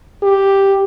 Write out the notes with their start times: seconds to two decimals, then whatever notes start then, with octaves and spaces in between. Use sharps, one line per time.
0.23 G4